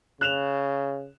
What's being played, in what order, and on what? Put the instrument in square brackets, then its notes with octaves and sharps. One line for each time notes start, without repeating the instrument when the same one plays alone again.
[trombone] C#3 [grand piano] F#6 E7 F7